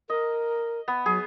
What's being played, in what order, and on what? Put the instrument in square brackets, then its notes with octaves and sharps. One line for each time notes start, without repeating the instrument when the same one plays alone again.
[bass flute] A#4 [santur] D#5
[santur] B3
[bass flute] F#3 [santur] G#4